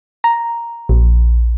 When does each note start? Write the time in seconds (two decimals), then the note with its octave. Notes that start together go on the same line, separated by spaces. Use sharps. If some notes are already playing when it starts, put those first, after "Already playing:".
0.24 A#5
0.89 A#1